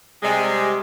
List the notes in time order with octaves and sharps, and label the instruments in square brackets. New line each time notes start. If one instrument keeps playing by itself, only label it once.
[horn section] C3 G3 G#3